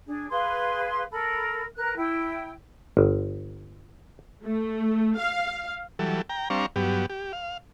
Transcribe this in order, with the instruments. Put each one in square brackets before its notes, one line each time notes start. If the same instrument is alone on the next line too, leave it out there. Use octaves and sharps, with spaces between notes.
[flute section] D4 G#4
G#4 B4 F5 C6
A4 A#4 B5
A#4 B4 F#6
E4 G5
[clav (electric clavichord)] G1
[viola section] A3
F5
[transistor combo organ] E3 F#3 G3 A4
G5 A#5
G3 C4 D4 F5 A#5 C#6
G2 F#3 B3 G4
G4
F5